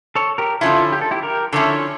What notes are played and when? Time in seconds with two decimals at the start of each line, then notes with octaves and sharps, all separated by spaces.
0.15 A4 C#5
0.38 G4 A#4
0.61 D3 F3 C#4 E4 F4 A4
0.92 G4
1.01 A4
1.11 E4 G4
1.22 G4 A#4
1.53 D3 F3 C#4 E4 A4 C#5